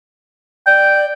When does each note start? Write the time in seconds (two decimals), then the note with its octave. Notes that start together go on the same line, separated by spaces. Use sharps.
0.67 D5 G5